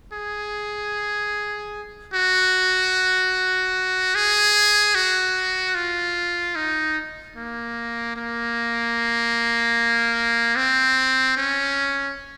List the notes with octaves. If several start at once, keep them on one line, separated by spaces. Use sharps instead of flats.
G#4
F#4
G#4
F#4
F4
D#4
A#3
A#3
C4
C#4